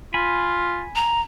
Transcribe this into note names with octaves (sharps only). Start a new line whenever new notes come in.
F4 G#5 B5
A#5